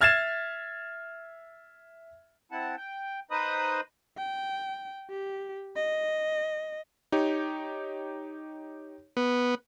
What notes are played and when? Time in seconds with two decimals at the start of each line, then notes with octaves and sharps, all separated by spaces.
0.01 E5 F6 G#6 A6 C7 E7
2.52 C4 E4 F#5 A5
2.77 G5
3.31 D#4 B4 C5 D#5 B5 D#6
4.18 G5
5.10 G4
5.76 D#5
7.12 D#4 G4 C#5
9.17 B3